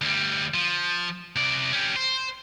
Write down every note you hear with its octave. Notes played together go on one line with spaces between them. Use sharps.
D2 G3
F3
C3 D5
C#4 G4
C5